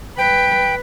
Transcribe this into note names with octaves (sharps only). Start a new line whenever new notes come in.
B4 G5